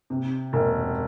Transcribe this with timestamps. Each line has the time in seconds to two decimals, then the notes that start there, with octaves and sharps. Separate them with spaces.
0.10 C3
0.53 E1